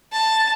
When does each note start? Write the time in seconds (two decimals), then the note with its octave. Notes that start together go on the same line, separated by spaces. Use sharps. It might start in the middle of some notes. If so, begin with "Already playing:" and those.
0.13 A5